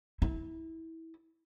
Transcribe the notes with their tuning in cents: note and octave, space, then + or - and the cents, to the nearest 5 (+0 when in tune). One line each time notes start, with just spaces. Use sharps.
E4 -25